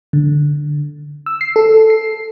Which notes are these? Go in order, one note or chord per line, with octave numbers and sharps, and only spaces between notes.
D3
E6
C7
A4
C7